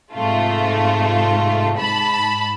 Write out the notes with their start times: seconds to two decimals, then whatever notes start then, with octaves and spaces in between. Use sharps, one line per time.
0.15 G#2 C3 A3 F4
1.79 G#2 A5 B5